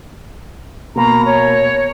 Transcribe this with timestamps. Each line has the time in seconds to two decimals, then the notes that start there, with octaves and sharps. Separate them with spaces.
0.96 B2 A#3 A#5
1.26 C#5